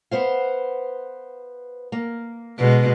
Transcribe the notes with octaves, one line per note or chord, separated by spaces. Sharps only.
B3 C5 F5
A#3
B2 D3 G#3